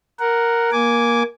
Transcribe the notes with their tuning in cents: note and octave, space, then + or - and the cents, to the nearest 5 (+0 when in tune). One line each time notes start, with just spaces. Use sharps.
A#4 +0 F#5 +0
A#3 +20 G#5 +0 D6 -15